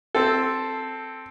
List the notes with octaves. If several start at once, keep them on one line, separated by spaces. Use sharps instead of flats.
C4 A4